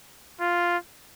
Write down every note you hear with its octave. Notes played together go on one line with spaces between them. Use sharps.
F4